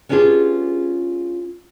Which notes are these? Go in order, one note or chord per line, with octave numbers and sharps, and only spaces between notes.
B3 C#4 D4 F4 G4 G#4